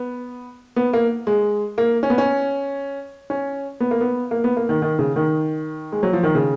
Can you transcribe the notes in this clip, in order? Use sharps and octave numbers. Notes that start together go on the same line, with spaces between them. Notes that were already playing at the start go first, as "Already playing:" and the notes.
Already playing: B3
B3
A#3
G#3
A#3
C#4
B3
C#4
C#4
B3
A#3
B3
A#3
B3
A#3
D#3
D#3
C#3
D#3
G#3
F#3
F3
D#3
C#3